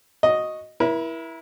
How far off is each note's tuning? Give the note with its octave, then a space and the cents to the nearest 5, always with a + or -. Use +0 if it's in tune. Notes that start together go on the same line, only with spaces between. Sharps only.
F#4 -10 D#5 +0
E4 +0 A#4 +45